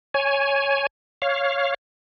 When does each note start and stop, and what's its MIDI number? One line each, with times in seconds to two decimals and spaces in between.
0.14 0.87 73
0.14 0.87 80
1.22 1.74 73
1.22 1.74 77